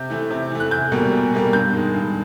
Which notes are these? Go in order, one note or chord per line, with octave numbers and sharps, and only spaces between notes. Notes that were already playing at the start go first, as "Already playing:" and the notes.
Already playing: C3 G6
E3 A3
C3
E3 A3
F#6
E2 G6
B2 G3 A#3
E2
B2 G3 A#3
G2 G6
D#3 G#3
G2